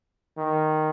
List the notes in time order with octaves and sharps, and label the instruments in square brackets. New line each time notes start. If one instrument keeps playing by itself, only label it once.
[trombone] D#3